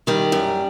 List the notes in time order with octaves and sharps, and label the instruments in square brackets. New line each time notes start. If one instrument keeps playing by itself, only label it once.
[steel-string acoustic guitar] D#3 G3
F#2